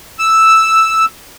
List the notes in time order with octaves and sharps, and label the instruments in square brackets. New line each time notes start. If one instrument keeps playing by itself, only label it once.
[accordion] E6